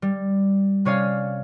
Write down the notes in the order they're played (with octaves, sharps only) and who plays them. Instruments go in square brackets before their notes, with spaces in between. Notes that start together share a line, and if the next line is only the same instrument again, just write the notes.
[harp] G3
C3 C#4 C#5 D5 F5 G#5